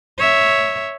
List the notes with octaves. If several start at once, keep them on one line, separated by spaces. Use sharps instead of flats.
C#5 E5